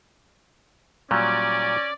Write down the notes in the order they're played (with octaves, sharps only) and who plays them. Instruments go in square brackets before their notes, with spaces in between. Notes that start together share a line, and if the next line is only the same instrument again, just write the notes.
[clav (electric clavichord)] A#2 F#3 G3 [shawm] C#4 [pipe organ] D5